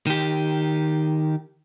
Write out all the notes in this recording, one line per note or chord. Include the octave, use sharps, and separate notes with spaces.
D#3 G4